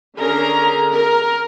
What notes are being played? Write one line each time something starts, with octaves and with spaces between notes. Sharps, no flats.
D3 C#4 G#4 A#4 A#5
A#4